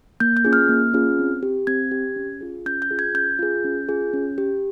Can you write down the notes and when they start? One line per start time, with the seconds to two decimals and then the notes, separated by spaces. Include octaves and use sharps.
0.20 A#3 G6
0.37 G6
0.45 C#4 F4 G#4
0.53 F6
0.69 A#3
0.94 C#4 F4 G#4
1.19 C4
1.43 G4
1.67 C4 G#6
1.91 G4
2.16 C#4
2.41 F4 G#4
2.66 C#4 G6
2.82 G6
2.91 F4 G#4
2.99 G#6
3.14 C#4 G6
3.39 F4 G#4
3.64 C#4
3.89 F4 G#4
4.13 C#4
4.38 G4